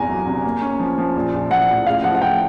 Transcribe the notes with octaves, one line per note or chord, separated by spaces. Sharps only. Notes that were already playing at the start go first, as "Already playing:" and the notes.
Already playing: G1 E2 C3 G#5 A#5
F#3
C3
A#3
C#4
F3
F3
A#1
A#1
F3 F#5
A2
C#3 F5
F3 F#5
F#5
F3 G5